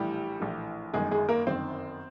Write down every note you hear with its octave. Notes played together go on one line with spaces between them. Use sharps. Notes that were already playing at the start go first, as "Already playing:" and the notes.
Already playing: A#1 A2 E3 G3 G4
A#1 A2 E3
G1 F#2 D#3 G#3 G#4
G#3 G#4
A#3 A#4
G1 F#2 D#3 C4 C5